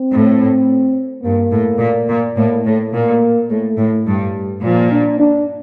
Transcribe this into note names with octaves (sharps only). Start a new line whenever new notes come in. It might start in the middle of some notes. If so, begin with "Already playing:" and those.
Already playing: C4
A2
G2 A#3
A2
A#2
A#2
A2 A#3
A2 A3
A#2 A#3
A2 A3
A2
G2 G3
A#2 F3
D4
D4